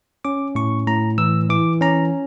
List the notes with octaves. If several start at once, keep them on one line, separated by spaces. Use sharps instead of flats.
C#4 D6
A2 C#6
A2 A#5
E3 E6
E3 D6
C#4 A#5